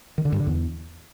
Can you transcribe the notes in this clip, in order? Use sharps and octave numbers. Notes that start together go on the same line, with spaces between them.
D#3
D3
G2
D3
E2